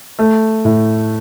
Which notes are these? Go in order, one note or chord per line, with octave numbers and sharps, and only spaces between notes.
A3
A2